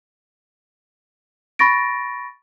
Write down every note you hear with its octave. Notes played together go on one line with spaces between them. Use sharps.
B5 C#6 A6 A#6 D7